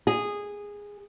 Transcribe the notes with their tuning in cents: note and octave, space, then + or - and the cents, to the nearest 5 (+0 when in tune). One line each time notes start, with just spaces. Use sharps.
G#4 -15